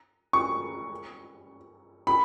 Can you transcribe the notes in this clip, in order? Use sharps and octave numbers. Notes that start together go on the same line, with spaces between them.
C#6
B5